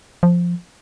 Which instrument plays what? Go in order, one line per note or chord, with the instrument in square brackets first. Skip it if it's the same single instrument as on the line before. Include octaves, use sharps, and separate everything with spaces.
[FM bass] F3